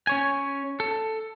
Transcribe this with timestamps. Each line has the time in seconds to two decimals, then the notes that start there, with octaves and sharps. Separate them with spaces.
0.07 C#4 C#5 G#5
0.80 A4